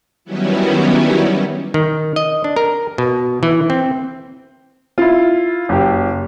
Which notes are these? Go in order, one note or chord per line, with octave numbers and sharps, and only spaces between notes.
D#3 F#3 G3 B3 C#4 E4
D#3
D#5
D4
A#4
B2
E3
C4
E4 F4
F#1 G4